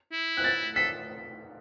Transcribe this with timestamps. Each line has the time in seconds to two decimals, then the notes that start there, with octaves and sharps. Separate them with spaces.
0.12 E4
0.37 F#6
0.44 A6
0.75 A4 B6